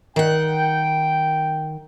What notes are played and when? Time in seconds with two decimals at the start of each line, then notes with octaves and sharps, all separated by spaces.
0.16 D#3 F#5 G5